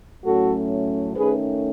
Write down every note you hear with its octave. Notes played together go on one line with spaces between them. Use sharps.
A2 F#3 A3 C#4 F#4 A4
D#3 A3 C#4 G#4 B4